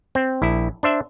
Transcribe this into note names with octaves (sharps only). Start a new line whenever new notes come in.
C4
A#1 E4
D4 C5 E5